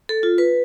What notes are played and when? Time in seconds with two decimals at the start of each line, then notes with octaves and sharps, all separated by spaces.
0.09 A4
0.23 F4
0.38 B4